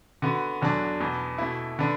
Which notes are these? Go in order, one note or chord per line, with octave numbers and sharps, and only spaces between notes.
D3 B3 F#4
E2 D3 F#3 D4
E2 B2 B3
B2 A3 E4
D3 B3 D4